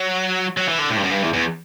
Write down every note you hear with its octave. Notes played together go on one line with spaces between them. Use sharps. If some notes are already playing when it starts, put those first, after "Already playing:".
Already playing: F#3
F#3
E3
D3
A2
G2
F#2
G2
E2
E2